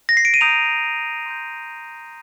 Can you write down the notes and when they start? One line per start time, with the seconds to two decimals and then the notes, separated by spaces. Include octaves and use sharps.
0.09 A#6
0.17 C7
0.25 D7
0.34 D#7
0.41 A#5 D#6 G6 F7
1.26 C6 D#6 G6